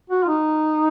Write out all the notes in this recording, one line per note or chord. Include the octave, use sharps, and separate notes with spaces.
F#4
F4
D#4